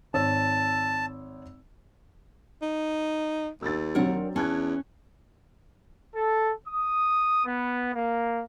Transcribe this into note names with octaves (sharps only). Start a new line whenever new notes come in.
G#1 C#5 A5 E6
D#4
D#2 E6 A6
F#3 C4 D4 A#4 C#5 F#5
E2 C#4 A5 F#6 G#6
A4
D#6
B3
A#3